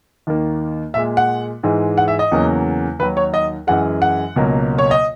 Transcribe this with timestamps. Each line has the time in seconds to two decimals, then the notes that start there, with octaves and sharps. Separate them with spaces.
0.27 D#2 D#3 A#3
0.94 A#2 G#3 E5
1.17 F#5
1.63 G#2 E3 G#3
1.98 F#5
2.08 E5
2.19 D#5
2.32 E2 C#3 F#3 A#3
2.99 D#2 D#3 F#3 B4
3.17 C#5
3.34 D#5
3.67 F#2 E3 G#3 F#5
4.02 F#5
4.36 C#2 B2 F#3 A#3
4.78 C#5
4.91 D#5